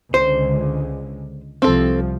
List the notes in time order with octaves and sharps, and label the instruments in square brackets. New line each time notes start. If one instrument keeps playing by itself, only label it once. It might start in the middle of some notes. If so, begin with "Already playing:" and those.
[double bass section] C#2 D3 G#3 [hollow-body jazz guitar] C5
[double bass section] C2 F3 [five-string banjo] C4 A4